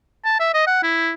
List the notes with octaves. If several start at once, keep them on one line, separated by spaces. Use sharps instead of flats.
A5
E5
D#5
F#5
E4